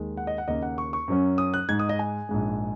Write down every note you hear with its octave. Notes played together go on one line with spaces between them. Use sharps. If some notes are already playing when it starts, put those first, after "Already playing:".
Already playing: D#2 D#3 G#3
F#5
D#5
F#5
D#2 C#3 A#3 D#5
F#5
C#6
C#6
F#2 F#3 C#4
D#6
F#6
G#2 G#3 D#4 G#6
D#6
D#5
G#5
A#1 G#2 G#3